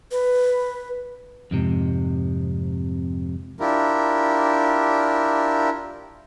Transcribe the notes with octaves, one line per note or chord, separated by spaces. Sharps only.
B4
F2 G#2 C3
D4 E4 F4 G4 A#4